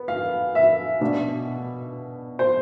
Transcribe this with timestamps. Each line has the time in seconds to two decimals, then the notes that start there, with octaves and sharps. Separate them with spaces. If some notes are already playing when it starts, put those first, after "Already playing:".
Already playing: B3
0.08 F5
0.55 E5
1.01 B2 B3 D4
2.39 C5